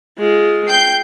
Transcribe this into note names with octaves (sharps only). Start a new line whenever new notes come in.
G#3 F4
G5 G6 C7